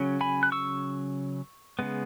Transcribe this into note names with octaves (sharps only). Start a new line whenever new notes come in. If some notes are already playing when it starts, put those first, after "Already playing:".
Already playing: C#3 F#3 C#4
G#5 B5
F#6
C#6 E6
C#3 G#3 B3